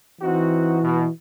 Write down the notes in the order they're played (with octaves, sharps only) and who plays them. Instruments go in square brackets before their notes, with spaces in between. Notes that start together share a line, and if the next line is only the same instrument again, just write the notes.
[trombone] E3 [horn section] C4 D#4 F#4
[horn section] B2